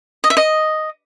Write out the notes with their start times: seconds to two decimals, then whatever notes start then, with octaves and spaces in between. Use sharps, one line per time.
0.24 D#5
0.30 E5
0.37 D#5